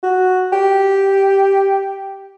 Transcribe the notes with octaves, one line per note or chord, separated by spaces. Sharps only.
F#4
G4